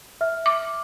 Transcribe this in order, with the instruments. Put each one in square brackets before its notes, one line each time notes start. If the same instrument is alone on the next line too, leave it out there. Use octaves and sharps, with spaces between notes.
[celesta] E5 F6
[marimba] D6